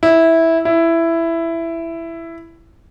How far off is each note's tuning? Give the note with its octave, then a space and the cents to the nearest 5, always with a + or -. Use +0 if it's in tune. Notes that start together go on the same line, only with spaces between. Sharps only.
E4 -10
E4 +10